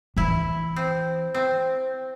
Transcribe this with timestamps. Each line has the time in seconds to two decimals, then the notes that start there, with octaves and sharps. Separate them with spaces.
0.17 E3 E4
0.76 C4
1.34 C4